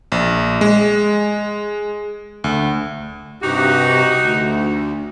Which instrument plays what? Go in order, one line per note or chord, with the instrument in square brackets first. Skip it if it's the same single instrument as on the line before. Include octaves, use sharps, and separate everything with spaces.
[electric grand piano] A#1
G#3
D2
[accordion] G2 C3 G4 [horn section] D#4 F#4
[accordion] D2